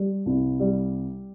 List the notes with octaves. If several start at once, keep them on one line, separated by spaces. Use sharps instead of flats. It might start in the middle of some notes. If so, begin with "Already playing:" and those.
Already playing: G3
C2
G3